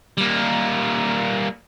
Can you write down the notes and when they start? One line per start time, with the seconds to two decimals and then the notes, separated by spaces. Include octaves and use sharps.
0.18 G3 A#3